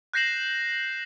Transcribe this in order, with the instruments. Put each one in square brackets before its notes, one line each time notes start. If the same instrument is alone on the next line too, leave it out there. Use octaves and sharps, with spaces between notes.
[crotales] F#6 G6 A#6 C7 E7 F#7